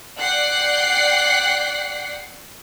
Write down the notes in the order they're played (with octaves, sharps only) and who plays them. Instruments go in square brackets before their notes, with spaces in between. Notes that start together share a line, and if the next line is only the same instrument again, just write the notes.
[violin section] D5 F#5 G5 F#6 C7